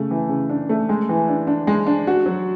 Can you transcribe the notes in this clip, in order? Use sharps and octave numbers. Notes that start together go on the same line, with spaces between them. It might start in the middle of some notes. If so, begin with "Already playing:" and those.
Already playing: C#3 A3
E3
C#3
D4
A3
G#3
E3
D4
D4
G#3
D4
F#4
F#3